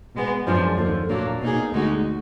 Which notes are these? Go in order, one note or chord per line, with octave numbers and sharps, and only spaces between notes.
B2 G#3 B3
F#2 F3 G#3 D4
D#2 D3 F3
A#2 F#3 A#3 D4
B2 A#3 D#4 G#4
D2 D3 G#3 D#4 F#4